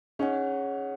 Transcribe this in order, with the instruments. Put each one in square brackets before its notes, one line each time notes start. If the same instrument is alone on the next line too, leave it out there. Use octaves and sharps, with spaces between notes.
[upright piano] C#4 D#4 [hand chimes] G#4 C#5 F#5